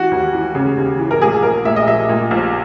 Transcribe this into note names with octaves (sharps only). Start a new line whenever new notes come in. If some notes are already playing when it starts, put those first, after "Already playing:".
Already playing: E3 F#4
D#2
E3
C#3
D#2
E3
A#4
A#1 G#4
A#1 A#4
A#2 E5
D#5
A#1 E5
A#2
A#1